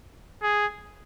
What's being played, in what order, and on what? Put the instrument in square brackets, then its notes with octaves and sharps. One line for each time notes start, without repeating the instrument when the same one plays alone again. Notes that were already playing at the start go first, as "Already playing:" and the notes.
[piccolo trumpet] G#4